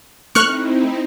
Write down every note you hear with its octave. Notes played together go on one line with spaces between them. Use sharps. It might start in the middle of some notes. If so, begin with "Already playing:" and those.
A3 C4 D#4 E4 C#6 F6 F#6